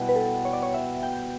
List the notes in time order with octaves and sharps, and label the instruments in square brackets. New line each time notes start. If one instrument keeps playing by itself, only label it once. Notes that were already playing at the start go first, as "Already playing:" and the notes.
Already playing: [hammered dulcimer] B2 G3 B3 E4
[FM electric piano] B4
A4
C#5
D5
C#5
E5
G5